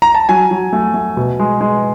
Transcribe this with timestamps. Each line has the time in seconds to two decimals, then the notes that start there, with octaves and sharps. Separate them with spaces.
0.02 A#5
0.15 A5
0.29 F#3 G#5
0.51 F#3
0.73 A3
0.94 A3
1.17 B2
1.40 G#3
1.61 G#3